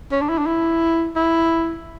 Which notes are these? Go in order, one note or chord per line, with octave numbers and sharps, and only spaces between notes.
C#4
D4
E4
D4
E4
E4